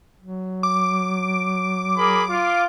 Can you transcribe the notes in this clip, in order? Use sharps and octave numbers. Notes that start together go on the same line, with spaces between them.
F#3
D6
G#4 A#4 B5
F4